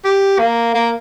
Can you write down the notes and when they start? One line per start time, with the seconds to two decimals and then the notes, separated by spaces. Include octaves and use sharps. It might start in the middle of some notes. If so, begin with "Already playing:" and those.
0.04 G4
0.39 A#3
0.74 A#3